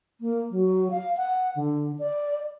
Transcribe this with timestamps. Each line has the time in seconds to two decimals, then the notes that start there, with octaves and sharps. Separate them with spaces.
0.21 A#3
0.51 F#3
0.91 F5
1.17 F#5
1.56 D3
1.99 D5